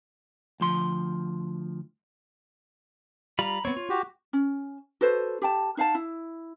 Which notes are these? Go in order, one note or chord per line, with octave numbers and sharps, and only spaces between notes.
D2 F3 C6
G3 F4 A#5 B5
B3 C4 C#5
F4
F#4 G4
C#4
F#4 A4 B4 C5
G4 G5 A5
D#4 F5 F#5 A5
E4